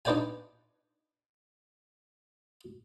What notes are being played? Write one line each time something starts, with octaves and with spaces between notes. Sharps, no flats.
D4 D#4 B4 D5 G5 G#5